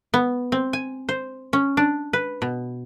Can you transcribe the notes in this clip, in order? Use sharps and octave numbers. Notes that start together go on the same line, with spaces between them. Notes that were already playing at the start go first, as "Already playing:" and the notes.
B3
C4
G#5
C5
C#4
D4
B4
B2